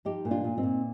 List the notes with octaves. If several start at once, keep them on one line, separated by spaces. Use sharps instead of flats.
F3 D#4 G4
A#2
D4 F4
A#2
C4 D#4
A#2